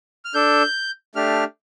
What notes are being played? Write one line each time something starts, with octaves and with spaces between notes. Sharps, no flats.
F6
D4 A4 G6
A3 D4 G4 F6